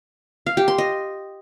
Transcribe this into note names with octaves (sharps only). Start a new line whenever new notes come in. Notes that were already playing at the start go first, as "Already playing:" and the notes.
F5
G4
C6
D#5